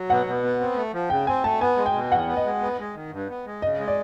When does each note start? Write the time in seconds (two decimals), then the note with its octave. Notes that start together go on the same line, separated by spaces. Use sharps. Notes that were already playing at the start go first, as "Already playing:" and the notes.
Already playing: F#3
0.09 B2 F#5
0.26 B2
0.43 B3
0.60 C4
0.76 A3
0.93 F3
1.10 C#3 G5
1.27 C4 G#5
1.44 A3 A5
1.60 B3 G#5
1.77 G#3
1.86 G5
1.94 B2
2.11 E2 F#5
2.27 B3
2.37 D#5
2.45 G#3
2.61 B3
2.79 G#3
2.95 D#3
3.12 G2
3.29 B3
3.46 G#3
3.62 C#3 D#5
3.79 G#3
3.88 D5